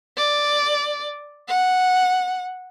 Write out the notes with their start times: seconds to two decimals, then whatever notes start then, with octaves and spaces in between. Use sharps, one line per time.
0.17 D5
1.48 F#5